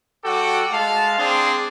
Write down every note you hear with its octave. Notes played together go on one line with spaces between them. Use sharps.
G3 F#4 A4 F#5 G5 D6
G#3 F5 A5
C4 D4 G#4 D5 C6